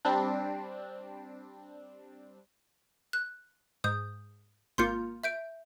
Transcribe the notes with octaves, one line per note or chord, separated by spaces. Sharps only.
G3 C4 D4
F#6
G#2 D#6 G6
G#1 A#3 F4 C6 G6 C#7
E5 G6 D7